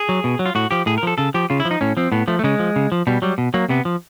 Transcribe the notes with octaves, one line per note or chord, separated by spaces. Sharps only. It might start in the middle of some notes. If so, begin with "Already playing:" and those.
Already playing: G#4
F#3
B2
F#3
F4
A2 F#4
F3 G4
A2 G#4
A#4
F3 A4
C#3 A4
F3 G4
C#3 F4
E4
F3
D#4
A2 C#4
F3 C4
A2 B3
F3 A3
A3
C#3 G#3
F3
C#3
F3
B2 G3
F#3 G3
B2
F#3 A#3
C3 B3
F3